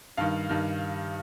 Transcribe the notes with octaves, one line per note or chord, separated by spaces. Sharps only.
G2 D#3 F5
G2 D#3